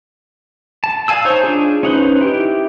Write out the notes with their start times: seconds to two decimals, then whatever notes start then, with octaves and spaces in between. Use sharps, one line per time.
0.84 A5
1.08 D5 F5 G#5 A5 E6
1.25 D#4 C5 C#5
1.43 D4 F4 G#4
1.83 C#4 D#4 B4 C5
2.21 E4 G4